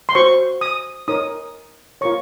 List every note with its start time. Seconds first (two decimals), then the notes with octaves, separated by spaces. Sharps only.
0.09 C6
0.15 F#4 C5 C#6
0.61 D#6
1.08 D#4 A#4 C#5 D#6
2.01 F4 A#4 C#5 C#6